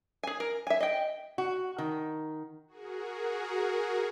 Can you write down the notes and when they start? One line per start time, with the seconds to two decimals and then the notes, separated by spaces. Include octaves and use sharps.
0.23 G#4 G#5
0.40 A#4
0.67 E5 G#5
0.80 D#5 G5
1.38 F#4
1.78 D#3
2.67 F#4 G#4 A#4